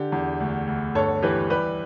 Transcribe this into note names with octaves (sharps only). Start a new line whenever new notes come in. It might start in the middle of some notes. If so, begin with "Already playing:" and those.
Already playing: D3 G4
E2
D2
D2
G1 A4 C#5
E3 G4 B4
G3 G4 B4